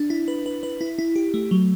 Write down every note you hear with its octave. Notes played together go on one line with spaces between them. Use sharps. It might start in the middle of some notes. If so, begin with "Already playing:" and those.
Already playing: D4
E4
B4
B4
B4
E4
E4
G4
A3
F#3